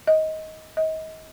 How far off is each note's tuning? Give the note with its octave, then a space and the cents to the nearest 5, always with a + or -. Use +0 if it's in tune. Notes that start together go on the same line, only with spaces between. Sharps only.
D#5 +15
D#5 +30